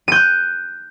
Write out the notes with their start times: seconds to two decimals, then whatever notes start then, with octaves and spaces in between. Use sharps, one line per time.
0.08 D#7
0.12 G6
0.16 F#6